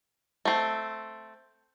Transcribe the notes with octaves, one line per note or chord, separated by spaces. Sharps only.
A3 C4